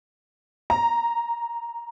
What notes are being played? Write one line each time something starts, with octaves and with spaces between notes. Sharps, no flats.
A#5